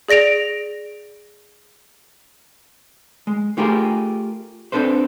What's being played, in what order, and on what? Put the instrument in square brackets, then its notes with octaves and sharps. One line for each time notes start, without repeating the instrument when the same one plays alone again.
[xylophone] G#4 D5 A#6 D7 F7
[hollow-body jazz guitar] G#3
A3 F4 G4 G#4 A#4
C4 D4 A4 B4 C5